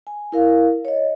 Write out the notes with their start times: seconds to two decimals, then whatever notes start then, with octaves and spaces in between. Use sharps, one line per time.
0.07 G#5
0.32 E4 A#4 F5
0.85 C#5 D#5